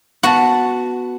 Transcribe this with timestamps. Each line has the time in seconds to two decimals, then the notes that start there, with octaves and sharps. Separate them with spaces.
0.23 B3 F#4 F#5 A5